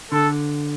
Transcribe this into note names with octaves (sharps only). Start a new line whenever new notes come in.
D3 A4